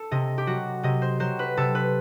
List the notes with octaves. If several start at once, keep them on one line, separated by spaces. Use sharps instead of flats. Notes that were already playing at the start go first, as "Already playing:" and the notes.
Already playing: A4
C3 D#5
G4
F#3 F#4
C3 D#5
C5
F#3 C5
B4
C3 A4
B4